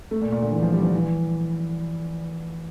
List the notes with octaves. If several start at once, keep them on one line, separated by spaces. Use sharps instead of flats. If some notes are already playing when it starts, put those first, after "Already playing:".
A3
A#2
A#2
D3
E3
F3
G3
F3
E3